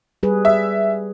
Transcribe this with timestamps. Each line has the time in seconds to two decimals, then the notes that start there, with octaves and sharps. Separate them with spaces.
0.23 G3 G#4 B4
0.45 E5